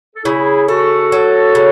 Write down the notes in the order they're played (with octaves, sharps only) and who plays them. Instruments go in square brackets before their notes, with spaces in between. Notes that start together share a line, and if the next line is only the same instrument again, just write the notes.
[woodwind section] A4
[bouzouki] C#3 [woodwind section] E4 G#4
[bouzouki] A3 [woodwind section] F#4 A4
[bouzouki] F#3
C#3